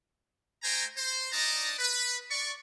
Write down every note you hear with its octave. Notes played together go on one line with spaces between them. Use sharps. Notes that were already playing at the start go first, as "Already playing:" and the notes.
A3 C5 G5 G#5 A#5
C5
D4 D#4 D5 D#5 A5 A#5
B4
D5 C#6